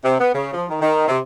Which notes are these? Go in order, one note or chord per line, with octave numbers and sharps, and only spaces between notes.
C3
B3
C#3
F3
D#3
D#3
C3